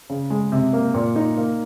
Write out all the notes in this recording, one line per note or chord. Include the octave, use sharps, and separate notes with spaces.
C#3
G#3
C3
A#3
A#2
D#4
A#3